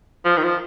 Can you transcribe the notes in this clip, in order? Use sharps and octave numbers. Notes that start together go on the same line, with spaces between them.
F3
D#3
F3